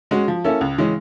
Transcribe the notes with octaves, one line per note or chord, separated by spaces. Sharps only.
G#3 C#4 F#4
F3
A#3 C#4 E4 A4
C#2
C#3 E3 G#3 C#4